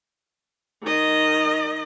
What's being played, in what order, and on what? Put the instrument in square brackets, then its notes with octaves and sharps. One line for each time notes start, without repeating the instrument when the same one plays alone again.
[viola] D#3 D#5